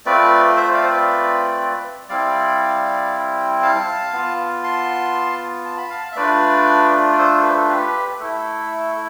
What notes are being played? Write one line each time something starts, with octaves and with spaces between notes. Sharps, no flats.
A3 C4 F4 B4 D5
C5 E5
D5 F5
C5
B4 D5
G3 C4 E4 D5 F5
F5 A5
B3 F4
A5 C6
A5
B5
F5 A5
E5
A3 D4 F4 B4 D5
D5
A4 C5
B4
A4
G4 B4
A3 E4 A4